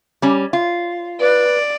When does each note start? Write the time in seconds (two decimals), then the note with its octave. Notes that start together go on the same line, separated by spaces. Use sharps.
0.22 G3 C#4
0.53 F4
1.20 B4 D5